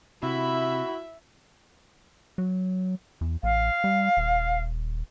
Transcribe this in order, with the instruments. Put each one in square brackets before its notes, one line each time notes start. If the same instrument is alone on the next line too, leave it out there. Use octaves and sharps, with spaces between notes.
[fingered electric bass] C3 [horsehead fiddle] E4 B5 [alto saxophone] F#4 [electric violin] E5
[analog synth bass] F#3
E2
[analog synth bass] A1 [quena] F5
[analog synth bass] G3
D#1